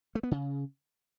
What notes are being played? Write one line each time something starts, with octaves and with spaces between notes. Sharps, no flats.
A3
B3
C#3